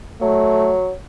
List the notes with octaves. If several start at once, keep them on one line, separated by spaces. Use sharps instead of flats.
F#3 A3